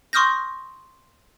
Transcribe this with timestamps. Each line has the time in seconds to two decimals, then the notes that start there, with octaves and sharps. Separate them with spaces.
0.13 C6 C#6 D#6 F6 G6 A#6